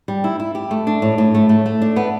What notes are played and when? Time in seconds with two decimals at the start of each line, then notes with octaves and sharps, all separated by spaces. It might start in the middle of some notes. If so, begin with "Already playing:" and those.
0.08 G3
0.24 E4
0.40 E4
0.55 G4
0.71 A3
0.87 D4
1.02 A2
1.18 A2
1.35 A3
1.49 A3
1.66 A3
1.82 D4
1.96 B3